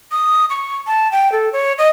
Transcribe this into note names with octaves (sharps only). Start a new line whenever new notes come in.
D#6
C#6
A5
G5
A4
C#5
D#5